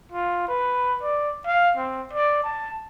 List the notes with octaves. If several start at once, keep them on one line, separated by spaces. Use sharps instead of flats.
F4
B4
D5
F5
C4
D5
A5